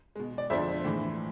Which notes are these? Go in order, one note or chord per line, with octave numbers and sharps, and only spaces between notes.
B2 G#3
D5
F2 D3 F3 C5 E5
A2 E3 G#3